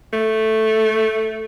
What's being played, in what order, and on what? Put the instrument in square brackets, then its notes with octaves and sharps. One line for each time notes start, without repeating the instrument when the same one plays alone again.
[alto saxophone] A3